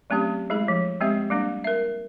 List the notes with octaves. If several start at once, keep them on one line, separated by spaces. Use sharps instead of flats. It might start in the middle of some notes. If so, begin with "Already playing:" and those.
F#3 A3 C4 C#4 G4
G#3 A3 E4 G#4
F3
G#3 B3 C4 G4 E5
G3 A#3 D4
A#4 E5